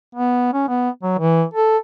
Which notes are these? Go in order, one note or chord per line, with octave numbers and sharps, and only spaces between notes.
B3
C#4
B3
F#3
E3
A4